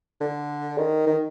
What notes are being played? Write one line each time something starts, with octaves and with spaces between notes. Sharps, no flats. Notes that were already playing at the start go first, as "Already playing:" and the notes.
D3
D#3
D#3